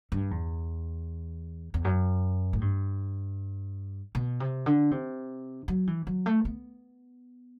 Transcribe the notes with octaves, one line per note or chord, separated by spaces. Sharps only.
G2
E2
E2
F#2
A2
G2
B2
C3
D3
C3
F#3
E3
F#3
A3
B3